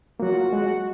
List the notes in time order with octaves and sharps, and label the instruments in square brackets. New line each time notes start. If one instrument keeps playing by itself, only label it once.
[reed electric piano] F#3 A#3 [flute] F#4
[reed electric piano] F4
G#3